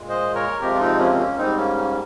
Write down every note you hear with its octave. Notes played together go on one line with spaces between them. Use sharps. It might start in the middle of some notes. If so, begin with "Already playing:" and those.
Already playing: A#2 G#3
C5 D#5
A#4 C#5
F2 C3 F3 G#3 G4 A#4
F4
C4 D#4
A#3 C#4
C4
A#3 C#4
G#2 G3 C4 D#4
A#3 C#4
A#3 C#4